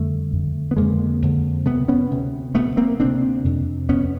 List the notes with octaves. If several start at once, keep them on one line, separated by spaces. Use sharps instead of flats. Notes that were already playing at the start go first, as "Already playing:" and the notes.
Already playing: F2 D3 G3 A3
F2 D3
B3
F2 D3 G#3 A#3
F2 D3
D2 C3 A3 B3
B3 C#4
D2 C3
D2 C3 A3 B3
A#3 C4
D2 C3 C4 D4
F2 C3
F2 C3 B3 C#4